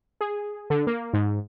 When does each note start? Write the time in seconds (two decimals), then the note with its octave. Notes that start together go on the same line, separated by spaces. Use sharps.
0.21 G#4
0.70 D3
0.87 A#3
1.13 G#2